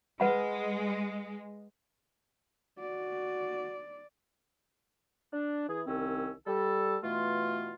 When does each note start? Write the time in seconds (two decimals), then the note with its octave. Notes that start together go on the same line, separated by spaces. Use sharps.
0.20 G#3 B4 F#5 B5
2.79 F#4 D5
5.33 D4
5.68 E3 G#4
5.87 C2 D#3 C4 C#4 E6
6.47 G3 A4
7.03 B2 E3 A3 F4